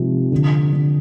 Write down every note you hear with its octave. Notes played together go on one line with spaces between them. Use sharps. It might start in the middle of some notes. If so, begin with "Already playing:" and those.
Already playing: G#2 C3 F3
D3
D3